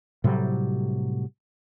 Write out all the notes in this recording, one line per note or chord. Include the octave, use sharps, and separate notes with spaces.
A2 C3 F#3 G3